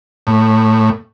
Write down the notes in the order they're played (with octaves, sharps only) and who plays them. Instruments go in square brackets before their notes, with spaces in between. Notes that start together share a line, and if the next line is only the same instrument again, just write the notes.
[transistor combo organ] A2